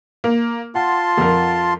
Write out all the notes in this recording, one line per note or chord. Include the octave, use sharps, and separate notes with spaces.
A#3
F4 F#5 A5 C6
F2 A#4